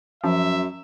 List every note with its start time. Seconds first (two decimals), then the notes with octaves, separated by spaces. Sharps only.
0.24 F#2 F3 E5